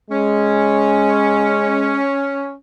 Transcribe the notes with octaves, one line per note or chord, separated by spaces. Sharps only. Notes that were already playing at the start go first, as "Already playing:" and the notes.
G#3 C#4